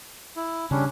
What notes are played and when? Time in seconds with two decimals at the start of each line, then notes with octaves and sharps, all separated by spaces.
0.36 E4
0.71 C#3 G3 C#4 D4